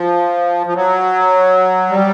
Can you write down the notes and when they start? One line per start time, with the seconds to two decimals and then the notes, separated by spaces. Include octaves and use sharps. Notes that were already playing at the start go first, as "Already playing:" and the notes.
Already playing: F3
0.66 F3
0.75 F#3
1.89 G3